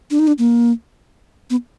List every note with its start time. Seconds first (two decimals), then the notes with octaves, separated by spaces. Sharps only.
0.11 D4
0.19 D#4
0.27 D4
0.38 A#3
1.50 B3